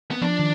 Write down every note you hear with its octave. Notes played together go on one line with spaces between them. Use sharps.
B3
F3 D4
D#3